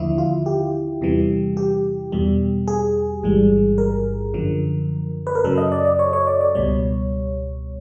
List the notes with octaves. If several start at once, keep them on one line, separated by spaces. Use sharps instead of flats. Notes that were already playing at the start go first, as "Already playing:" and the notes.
Already playing: D#2 D3 F3 E4
F4
G4
E2 C3 E3 G3
G4
E2 B2 G3
G#4
A1 G#2 E3 G3
A#4
F#2 D3 F3
B4
A#4
F#2 C#3 F#3 A4
D#5
D5
D5
C#5
C#5
D5
D5
C#2 B2 G3 C#5